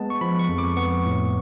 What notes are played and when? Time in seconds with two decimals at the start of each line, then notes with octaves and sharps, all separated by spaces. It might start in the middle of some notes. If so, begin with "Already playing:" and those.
Already playing: G#3 B3 A5
0.10 C#6
0.21 F3 B5
0.39 C#6
0.49 F2
0.58 D6
0.76 B3 C#6
1.05 A2